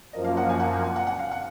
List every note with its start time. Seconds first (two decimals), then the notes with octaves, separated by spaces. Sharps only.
0.13 F#2 F3 A#3 D#5
0.24 F5
0.37 F#5
0.49 G#5
0.60 F#5
0.73 G#5
0.84 G#5
0.96 F#5
1.07 F#5
1.19 F5
1.31 F#5